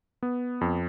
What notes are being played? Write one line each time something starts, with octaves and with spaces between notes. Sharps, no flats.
B3
F2